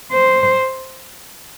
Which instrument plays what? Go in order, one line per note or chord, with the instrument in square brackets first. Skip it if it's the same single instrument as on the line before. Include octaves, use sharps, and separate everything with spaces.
[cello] C5